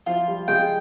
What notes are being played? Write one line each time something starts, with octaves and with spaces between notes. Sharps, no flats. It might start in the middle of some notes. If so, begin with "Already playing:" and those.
F3 F4
G3
G#3 G5